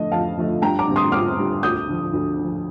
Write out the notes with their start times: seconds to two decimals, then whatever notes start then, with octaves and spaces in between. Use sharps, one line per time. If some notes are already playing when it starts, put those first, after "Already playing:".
Already playing: F2 D3 F3 A3 D#5
0.12 F2 F5 A5
0.37 D3 F3 A3
0.62 G2 G5 A#5
0.79 A#5 D6
0.87 D3 G3 C4
0.96 C6 D#6
1.12 G2 D6 F6
1.38 D3 G3 C4
1.63 D2 D#6 G6
1.89 D3 F3
2.13 D2
2.39 D3 F3